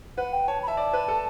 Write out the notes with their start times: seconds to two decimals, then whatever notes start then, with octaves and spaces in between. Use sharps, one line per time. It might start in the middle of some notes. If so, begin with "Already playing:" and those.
0.17 B4 F#5
0.33 G5
0.48 C#5 A5
0.63 B5
0.67 E5 A5
0.77 D5
0.93 B4
1.08 A4